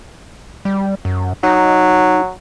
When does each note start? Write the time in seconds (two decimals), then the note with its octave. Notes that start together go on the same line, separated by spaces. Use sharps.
0.65 G3
1.05 F#2
1.43 F#3 D#4